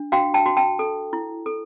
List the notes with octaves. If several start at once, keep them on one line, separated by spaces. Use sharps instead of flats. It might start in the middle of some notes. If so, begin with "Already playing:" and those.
Already playing: D4
F#4 F5 G5
G5 A5
F#4
G5 A5
A4
E4
A4